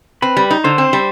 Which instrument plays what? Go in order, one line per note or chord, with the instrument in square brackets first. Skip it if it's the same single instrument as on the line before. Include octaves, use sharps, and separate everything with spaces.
[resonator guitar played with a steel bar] C4 [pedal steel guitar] B4
[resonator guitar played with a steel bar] G3
D#4
[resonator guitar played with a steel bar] D3 [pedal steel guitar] C5
[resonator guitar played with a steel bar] C4
G3